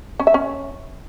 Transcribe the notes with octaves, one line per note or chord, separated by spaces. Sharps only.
C#4
E5
C#4